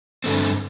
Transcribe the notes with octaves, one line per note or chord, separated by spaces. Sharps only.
G2 D3 A3 C4